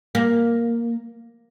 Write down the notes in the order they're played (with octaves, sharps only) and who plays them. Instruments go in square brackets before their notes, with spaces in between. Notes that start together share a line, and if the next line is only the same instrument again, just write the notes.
[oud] A#3